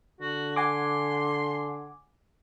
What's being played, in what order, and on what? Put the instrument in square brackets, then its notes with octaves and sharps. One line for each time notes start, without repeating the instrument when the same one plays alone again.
[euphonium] D3 [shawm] F#4
[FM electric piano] F#5 G#5 D6 [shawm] C6